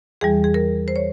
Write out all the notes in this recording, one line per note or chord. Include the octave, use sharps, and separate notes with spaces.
E2 E3 G3 G#4
G#4
A#4
C5
C#5